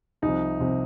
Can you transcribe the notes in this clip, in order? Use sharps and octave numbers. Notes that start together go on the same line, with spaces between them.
C2 C3 F3 D#4
C2 C3 F3